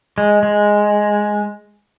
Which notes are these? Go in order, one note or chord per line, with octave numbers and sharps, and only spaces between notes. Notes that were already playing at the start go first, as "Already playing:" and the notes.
G#3
G#3